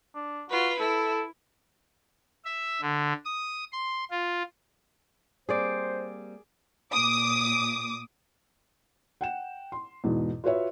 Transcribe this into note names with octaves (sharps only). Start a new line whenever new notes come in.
D4
F4 F#4 B4
E4 A4
E5
D3
D#6
C6
F4
G3 A#3 C4 G#4 C5 D5
A#2 D6 D#6
F#5 G5 E7
C6
E2 G#2 B2
F4 F#4 B4 C#5 E5